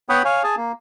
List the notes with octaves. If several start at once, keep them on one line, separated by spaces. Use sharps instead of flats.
B3 C#5 F#5 G5 B5 D#6
C#5 F5 G#5
G#4 G#5 A5
A#3